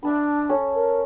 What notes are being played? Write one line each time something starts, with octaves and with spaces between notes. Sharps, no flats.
D4 E5 A5 B5
C#4 A4
A#4